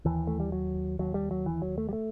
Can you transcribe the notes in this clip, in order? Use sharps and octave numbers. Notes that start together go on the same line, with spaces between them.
D#2 E3
A3
G3
F#3
D#2 F#3
G3
F#3
E3
F#3
A3
G3
A3